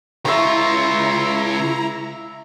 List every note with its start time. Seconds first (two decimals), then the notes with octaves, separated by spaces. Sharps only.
0.25 C#2 E4 F4 E5 A#5 C#6